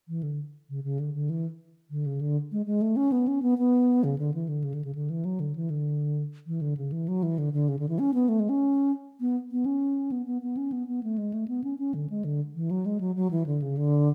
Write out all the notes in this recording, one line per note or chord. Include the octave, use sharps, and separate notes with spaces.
E3
D3
C#3
C#3
D3
D3
E3
D3
C#3
D3
G#3
G#3
A3
C#4
B3
C#4
B3
B3
C#3
D3
E3
D3
C#3
D3
C#3
D3
E3
F#3
D3
E3
D3
E3
D3
C#3
E3
F#3
E3
D3
D3
C#3
D3
E3
C#4
B3
A3
G#3
C#4
B3
B3
C#4
B3
B3
B3
C#4
B3
B3
A3
G#3
A3
B3
C#4
C#4
D3
G#3
D3
E3
F#3
G#3
F#3
F#3
E3
D3
C#3
D3